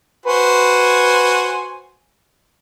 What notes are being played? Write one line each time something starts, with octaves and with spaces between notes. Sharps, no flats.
F#4 B4 C5 G#5